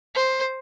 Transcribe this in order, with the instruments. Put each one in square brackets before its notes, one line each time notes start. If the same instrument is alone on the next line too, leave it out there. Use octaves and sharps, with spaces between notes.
[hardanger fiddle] C5